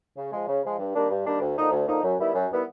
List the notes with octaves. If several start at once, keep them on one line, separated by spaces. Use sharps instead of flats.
C#3
F3 G#3
C#3
F3 G#3
G2
D#3 G3 A#3 D4
G2
D#3 G3 A#3 D4
D2
D3 F3 A#3 D#4
D2
D3 F3 A#3 D#4
F#2
D#3 G3 B3 E4
F#2
D#3 G3 B3 E4